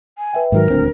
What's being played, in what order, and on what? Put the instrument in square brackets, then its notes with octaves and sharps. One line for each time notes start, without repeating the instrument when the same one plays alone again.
[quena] G#5
[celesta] B4 E5 G5
[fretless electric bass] G#2 D#3 F#3 [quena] A#4
[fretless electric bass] D#1 D2 C4 [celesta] D4